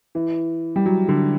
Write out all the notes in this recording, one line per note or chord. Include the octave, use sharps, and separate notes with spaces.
E3
G3
F#3
D3